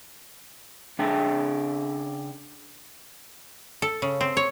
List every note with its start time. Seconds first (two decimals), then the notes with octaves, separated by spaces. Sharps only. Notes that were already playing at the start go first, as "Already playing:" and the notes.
0.99 C#3 D4 G#4 E5 G5 A5
3.82 A4
4.02 C#3
4.21 C4
4.37 C#5